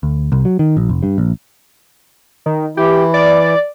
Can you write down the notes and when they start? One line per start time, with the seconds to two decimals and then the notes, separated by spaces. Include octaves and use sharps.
0.03 D2
0.32 C2
0.45 F#3
0.59 D#3
0.77 A#1
0.89 F1
1.03 G2
1.18 A#1
2.46 D#3
2.77 E3 E4 G4
3.14 D5